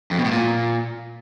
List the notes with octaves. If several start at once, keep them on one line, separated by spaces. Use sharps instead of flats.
F2
B2
A2
A#2